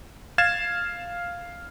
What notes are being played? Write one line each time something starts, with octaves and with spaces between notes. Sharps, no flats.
F5 G#6 A6 E7